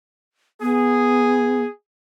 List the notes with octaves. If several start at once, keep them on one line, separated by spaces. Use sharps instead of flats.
B3 G#4